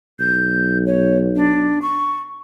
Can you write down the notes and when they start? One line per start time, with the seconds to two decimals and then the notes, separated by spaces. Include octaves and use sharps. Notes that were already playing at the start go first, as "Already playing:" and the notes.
0.20 B1 G6
0.86 C#5
1.36 D4
1.82 C#6